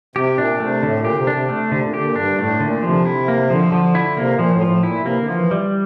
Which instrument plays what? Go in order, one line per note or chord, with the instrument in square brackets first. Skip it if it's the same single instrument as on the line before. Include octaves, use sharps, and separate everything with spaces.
[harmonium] C3 [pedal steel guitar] G4
[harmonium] A#2 [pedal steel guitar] D4
[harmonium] C3 [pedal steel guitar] A3
[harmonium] A2 [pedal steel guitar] D3
[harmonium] A#2
[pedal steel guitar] G4
[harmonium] C3
[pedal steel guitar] D4
[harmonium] C3
[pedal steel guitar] A3
[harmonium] C3
[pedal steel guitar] D3
[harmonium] A#2
[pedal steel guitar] G4
[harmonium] A#2
[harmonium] G2 [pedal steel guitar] D4
[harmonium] A2 [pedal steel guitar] A3
[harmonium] A#2 [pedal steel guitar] D3
[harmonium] C3 [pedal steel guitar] F3
[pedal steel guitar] E4
A#3
[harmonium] D3 [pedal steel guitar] F3
[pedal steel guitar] F3
E4
[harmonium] C3 [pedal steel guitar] A#3
[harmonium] A#2 [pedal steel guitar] F3
[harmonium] A2
[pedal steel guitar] F3
[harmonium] A2
[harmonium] A#2 [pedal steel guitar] E4
[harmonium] C3
[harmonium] E3 [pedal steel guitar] A#3
[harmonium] D3
[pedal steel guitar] F3
[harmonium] E3
[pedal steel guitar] G3